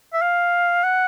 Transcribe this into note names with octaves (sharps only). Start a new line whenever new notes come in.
E5
F5
F#5